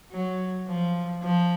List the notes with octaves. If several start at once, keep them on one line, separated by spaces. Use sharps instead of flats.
F#3
F3
F3